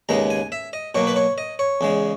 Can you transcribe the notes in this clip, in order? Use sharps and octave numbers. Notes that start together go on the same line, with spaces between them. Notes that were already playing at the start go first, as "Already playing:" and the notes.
D#2 C#3 G#3 B3 A#5
G#5
E5
D#5
B2 F#3 A#3 C#5
B4
C#5
D#5
C#5
E2 C#3 G#3